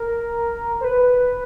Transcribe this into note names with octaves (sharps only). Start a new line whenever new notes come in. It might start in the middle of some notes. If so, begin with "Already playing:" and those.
Already playing: A#4
C5
B4